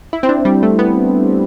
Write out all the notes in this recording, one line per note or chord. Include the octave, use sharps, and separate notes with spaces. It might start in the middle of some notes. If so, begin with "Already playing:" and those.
E4
C4
D4
G3
A3
B3